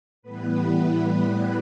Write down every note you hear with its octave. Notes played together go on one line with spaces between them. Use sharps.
A2 E3 G3 B3 B4